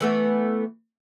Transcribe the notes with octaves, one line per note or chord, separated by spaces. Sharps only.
E3 A3 B3